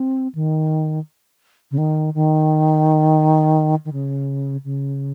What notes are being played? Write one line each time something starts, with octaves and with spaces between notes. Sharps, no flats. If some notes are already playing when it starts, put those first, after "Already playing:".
Already playing: C4
D#3
C#3
D#3
D#3
D#3
C#3
C#3